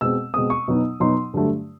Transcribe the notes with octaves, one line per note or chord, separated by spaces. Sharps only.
B2 G#3 C4 E6
B2 G#3 C4 D#6
C#6
B2 F#3 B3 D#4
B2 F#3 B3 D#4 C6
G2 D3 F#3 A3